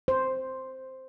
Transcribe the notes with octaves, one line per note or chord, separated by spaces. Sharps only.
C5